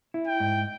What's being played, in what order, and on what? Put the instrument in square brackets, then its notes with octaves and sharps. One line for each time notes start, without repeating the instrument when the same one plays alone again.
[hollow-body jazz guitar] E4
[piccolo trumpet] G5
[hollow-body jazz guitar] G#2